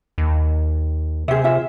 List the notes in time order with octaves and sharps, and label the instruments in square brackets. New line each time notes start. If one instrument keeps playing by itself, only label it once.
[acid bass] D#2
[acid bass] C3 [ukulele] G#4 E5
[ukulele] F4 E5